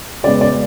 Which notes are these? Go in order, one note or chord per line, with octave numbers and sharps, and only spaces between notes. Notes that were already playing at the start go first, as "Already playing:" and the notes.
C#3 G#3 B3 D5
D5